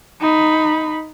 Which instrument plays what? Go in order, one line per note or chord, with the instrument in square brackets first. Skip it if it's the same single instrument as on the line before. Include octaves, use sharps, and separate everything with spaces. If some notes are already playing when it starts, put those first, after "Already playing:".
[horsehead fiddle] D#4 B5